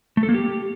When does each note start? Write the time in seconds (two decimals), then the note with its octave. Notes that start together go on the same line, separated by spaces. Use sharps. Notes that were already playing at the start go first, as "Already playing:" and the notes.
0.17 A3
0.23 A4
0.29 A#3
0.34 G4